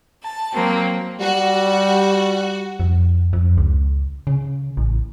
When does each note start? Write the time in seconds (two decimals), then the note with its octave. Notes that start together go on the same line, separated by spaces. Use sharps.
0.23 A5
0.53 F#3 A#3 C4
1.20 G3 F#4
2.80 F2
3.33 F2
3.58 C#2
4.27 C#3
4.77 A1